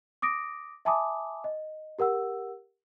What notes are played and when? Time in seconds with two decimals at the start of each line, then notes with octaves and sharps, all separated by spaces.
0.22 D6 D#6 A#6 D7
0.85 E5 G#5 A5 B5 D6 D#6
1.44 D#5
1.99 G4 A#4 F#5 E6